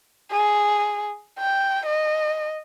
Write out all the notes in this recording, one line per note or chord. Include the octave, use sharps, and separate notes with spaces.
G#4
G5
D#5